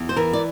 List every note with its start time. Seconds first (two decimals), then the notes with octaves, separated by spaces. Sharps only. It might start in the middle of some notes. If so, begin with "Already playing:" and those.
Already playing: E2
0.09 C5
0.16 E3 A#4
0.33 D5